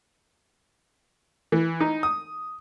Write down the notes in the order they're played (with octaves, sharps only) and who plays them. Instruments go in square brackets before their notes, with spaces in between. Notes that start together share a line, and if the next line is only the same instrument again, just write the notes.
[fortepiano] E3
D#4
D#6